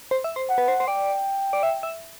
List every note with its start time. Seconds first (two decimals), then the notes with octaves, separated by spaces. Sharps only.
0.11 C5
0.24 E5
0.36 C5
0.49 F#5
0.58 B4
0.68 C5
0.80 C5
0.88 D5 G5
1.53 D5
1.63 E5
1.83 E5